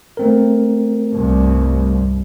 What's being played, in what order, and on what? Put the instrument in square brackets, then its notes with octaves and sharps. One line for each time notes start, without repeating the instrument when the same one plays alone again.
[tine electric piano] A3 C4 A#4
[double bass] C2 G2